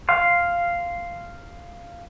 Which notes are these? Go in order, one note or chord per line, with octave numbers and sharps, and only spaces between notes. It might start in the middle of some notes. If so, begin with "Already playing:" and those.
F5 C6